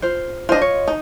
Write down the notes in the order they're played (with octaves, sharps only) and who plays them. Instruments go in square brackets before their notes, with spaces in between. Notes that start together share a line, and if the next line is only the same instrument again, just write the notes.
[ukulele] F4 C5
[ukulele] D4 D#4 C5 [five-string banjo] F4 D#5
[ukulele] C#5
[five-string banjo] D#4